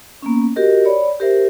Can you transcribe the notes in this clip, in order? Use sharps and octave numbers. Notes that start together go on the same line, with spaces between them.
A#3 B3 C#4
F#4 G4 A#4 D#5
C#5 D5 B5
G4 A#4 C5 E5